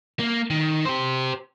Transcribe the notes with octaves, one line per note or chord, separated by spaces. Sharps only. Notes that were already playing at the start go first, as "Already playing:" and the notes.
A#3
D#3
G4 C5